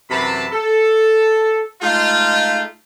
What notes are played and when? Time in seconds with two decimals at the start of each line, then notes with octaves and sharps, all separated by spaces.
0.11 F#2 C3 E3 A5 B5
0.52 A4
1.82 G#3 A3 D#4 F4